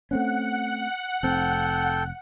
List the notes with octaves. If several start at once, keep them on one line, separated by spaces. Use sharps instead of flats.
A3 C4 C#4 F#5
F1 C4 A4 G5